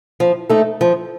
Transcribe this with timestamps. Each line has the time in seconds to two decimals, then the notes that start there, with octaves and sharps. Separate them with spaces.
0.20 F3
0.50 A3 D#4 A4
0.81 F3